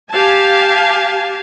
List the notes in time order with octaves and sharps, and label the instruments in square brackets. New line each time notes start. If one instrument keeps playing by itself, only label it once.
[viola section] G4 F5 G#5 A5